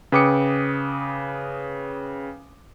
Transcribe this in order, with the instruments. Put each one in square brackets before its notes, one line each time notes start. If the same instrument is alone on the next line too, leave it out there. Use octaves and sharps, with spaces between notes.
[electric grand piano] C#3 B4 G5 D6 D#6 C#7